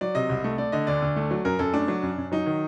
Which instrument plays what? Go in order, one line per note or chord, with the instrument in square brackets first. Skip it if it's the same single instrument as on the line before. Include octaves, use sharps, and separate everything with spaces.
[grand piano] F#3 D5
C3 D#5
C2
A3
A3 D5
D3 D#5
D2 D5
D2
A3
F#3
F#2 A#4
F#2 A4
A3 D4
F#3
F#2
F#2
F#3 D#4
D#3